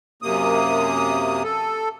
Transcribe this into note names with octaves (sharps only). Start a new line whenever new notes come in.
F#2 C3 A#3 D#6
A4